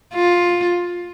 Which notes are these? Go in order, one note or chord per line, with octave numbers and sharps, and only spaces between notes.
F4